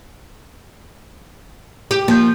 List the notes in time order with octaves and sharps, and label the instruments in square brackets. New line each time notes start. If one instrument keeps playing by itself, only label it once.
[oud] G4
[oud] F3 [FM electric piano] A#3 G6